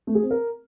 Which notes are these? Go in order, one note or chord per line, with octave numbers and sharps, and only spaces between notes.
A3
G#4
C4
A#4